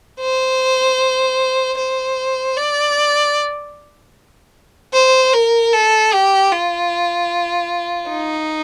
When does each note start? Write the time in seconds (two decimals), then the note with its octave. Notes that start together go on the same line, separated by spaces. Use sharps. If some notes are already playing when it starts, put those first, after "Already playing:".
0.20 C5
1.78 C5
2.57 D5
4.94 C5
5.33 A#4
5.73 A4
6.13 G4
6.51 F4
8.10 D#4